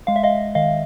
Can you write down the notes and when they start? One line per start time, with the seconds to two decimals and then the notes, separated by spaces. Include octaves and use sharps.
0.07 G#3 F5
0.16 E5
0.23 D#5 F5
0.55 D#3 D#5 F5